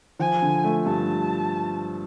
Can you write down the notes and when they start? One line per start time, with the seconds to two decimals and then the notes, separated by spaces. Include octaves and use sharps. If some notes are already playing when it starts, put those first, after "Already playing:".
0.19 F3 G#5
0.42 D3
0.64 A3
0.86 G2 A5